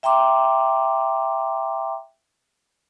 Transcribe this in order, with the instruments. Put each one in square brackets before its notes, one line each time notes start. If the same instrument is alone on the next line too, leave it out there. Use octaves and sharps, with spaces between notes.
[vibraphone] E5 G5 A#5 C6 D6